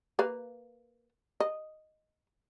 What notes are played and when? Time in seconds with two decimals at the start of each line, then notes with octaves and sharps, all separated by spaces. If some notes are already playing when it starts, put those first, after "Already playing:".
0.19 A#3 B4 F5
1.40 D#5